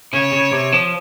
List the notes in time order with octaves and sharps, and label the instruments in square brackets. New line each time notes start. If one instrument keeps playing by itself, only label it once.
[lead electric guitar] C#3 [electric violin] C#5
[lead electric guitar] C#3
C3
F3